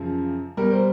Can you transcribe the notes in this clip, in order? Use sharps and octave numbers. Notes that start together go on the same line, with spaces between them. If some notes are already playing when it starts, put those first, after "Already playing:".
Already playing: F#2 C#3 F3
B2 G3 A#4
C5